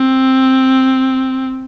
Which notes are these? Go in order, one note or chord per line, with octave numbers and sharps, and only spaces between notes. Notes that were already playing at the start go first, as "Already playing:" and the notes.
Already playing: C4